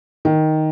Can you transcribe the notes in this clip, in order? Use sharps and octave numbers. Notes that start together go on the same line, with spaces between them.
D#3